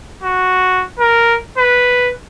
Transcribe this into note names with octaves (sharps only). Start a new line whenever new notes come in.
F#4
A#4
B4